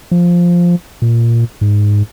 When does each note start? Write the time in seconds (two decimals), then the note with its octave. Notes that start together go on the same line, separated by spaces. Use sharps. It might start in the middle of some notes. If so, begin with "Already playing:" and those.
0.11 F3
1.02 A#2
1.61 G#2